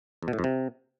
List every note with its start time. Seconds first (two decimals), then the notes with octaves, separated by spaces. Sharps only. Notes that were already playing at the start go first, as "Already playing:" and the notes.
0.23 E2
0.28 B2
0.33 A2
0.39 F2
0.44 C3